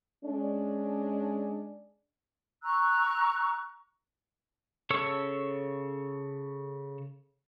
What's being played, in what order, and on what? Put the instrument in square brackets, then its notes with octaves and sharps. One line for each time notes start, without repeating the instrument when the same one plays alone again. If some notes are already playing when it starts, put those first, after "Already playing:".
[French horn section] G#3 C#4 D4
[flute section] A#5 C#6 E6 F#6
[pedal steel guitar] C#3 A4 C#5 C#6 E6